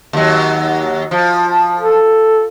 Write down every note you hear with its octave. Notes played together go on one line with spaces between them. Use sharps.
D#2 F#3
F3
A4